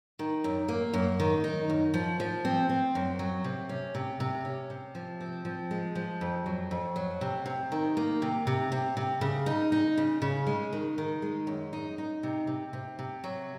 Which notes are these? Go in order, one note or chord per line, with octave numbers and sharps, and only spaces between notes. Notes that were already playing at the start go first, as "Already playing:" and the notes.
D#3
F#2
A#3
F#2
D#3
D#4
F#2
F3
F3
C4
C4
F#2
F#3
C3
C#4
C3
C3
C#4
C3
F3
C4
F3
G#3
F3
F2
F#3
F2
F#3
C3
C3
D#3
A#3
C3
C3
C3
C3
C#3
D#4
D#4
C#3
C#3
G#3
D#3
D#3
G#3
F#2
D#4
D#4
C3
C3
C3
C3
F#3